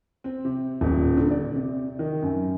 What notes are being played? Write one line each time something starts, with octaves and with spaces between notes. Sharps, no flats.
C4
C3
D#1
D3
D5
C3
D#3
F#2